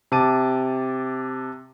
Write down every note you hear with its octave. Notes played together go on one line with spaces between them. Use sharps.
C3 A5 D6 D#7